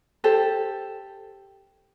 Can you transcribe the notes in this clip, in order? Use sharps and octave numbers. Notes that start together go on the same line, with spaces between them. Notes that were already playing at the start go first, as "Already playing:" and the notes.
G4 A4 C5